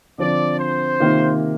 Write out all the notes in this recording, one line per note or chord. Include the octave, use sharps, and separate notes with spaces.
D3 F3 C4 D5
C5
C3 D#3 A#3 F4